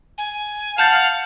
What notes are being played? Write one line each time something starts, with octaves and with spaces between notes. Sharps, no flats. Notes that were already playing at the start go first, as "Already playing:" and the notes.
G#5
F5 F#5 A5 G6 A6